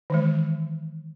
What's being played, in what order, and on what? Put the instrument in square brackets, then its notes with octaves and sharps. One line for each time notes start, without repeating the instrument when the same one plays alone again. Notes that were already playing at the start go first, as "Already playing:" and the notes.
[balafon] D#3 E3 G#3